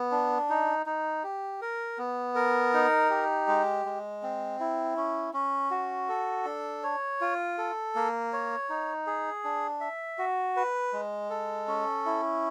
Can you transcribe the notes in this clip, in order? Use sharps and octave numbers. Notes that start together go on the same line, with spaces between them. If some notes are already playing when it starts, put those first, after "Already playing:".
Already playing: B3
D4
D#4
D#4
G4
A#4
B3
A#4
D#4
G4
G#3
G#3
C4
E4
C#4
C#4
F#4
A4
D4
C#5
F4
A4
A#3
C#5
D#4
G#4
D4
E5
F#4
B4
G#3
A4
C#4
E4